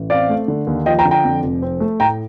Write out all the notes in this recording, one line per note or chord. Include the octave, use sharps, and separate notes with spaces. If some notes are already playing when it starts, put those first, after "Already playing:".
Already playing: A1
C4 D5 F5
A3
D3
D#2
F3 D#5 G5
G5 A#5
D3
G5 A#5
F2
F1
C4
A3
A2 G5 A#5